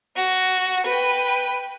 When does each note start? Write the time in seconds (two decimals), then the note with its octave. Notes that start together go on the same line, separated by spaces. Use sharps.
0.16 F#4
0.86 B4 G5